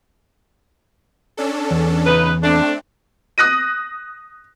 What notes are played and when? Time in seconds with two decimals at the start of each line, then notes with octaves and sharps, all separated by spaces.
1.37 C#4 D4 A4
1.71 E2
2.06 C#3 D#4 B4
2.43 A3 C4 D4
3.38 D#6 F#6 A#6 D#7